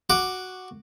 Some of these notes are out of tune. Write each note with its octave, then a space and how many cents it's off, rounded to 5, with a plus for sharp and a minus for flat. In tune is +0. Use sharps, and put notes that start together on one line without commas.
F#4 +0 D6 +5